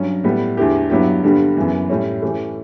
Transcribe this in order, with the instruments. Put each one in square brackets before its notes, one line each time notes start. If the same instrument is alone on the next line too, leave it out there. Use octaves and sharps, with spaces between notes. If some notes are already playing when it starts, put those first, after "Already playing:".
Already playing: [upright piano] G2 F#3 C#4
A2 G3 B3
E2 D3 A3 E4 G4
G2 F#3 B3 E4 G4
G2 D3 G3 B3
F#2 C#3 E3 B3
A2 G3 C#4
E3 A3 C#4 G4